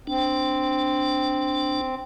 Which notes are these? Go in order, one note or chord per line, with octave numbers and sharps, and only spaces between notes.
C4 D4